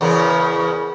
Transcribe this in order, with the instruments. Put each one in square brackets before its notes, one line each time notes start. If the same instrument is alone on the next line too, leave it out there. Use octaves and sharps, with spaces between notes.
[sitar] E2 C#3 A#4